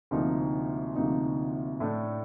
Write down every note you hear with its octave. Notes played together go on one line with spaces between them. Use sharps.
D2 C3 F3 A#3 D#4
D2 C3 F3 A#3 D#4
A2 A3 D4